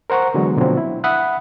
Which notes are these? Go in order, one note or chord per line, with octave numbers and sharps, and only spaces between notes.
A#4 C5 F#5 A#5 C#6
D3 E3 F#3 G#3 B3
B2 D3 F3 F#3 A3 C4
E4
E5 F#5 B5 D#6 F#6